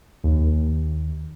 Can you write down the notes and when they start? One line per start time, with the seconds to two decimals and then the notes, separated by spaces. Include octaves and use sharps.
0.24 D#2